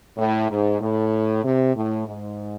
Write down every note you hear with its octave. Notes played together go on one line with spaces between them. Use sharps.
A2
G#2
A2
C3
A2
G#2